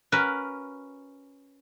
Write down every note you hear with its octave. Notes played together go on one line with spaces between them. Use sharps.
C#4 F#4 A#4 B4